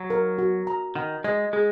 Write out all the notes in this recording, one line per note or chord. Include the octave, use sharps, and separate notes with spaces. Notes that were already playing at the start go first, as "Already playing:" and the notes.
Already playing: F#3
A#4
F#4
A#5
D#3 F#5
G#3 D#5
G#3 G#4